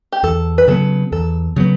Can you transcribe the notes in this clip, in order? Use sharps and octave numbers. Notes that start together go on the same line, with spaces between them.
G4
E2 A4
B4
C#3 F#3 B3 A4
E2 A4
C#3 F#3 B3